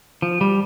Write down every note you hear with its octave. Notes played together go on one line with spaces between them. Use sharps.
F3
G3